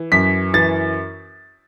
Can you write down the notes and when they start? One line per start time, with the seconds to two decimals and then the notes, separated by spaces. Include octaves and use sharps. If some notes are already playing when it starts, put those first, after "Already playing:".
Already playing: E3
0.12 F#2 B6
0.54 E3 A6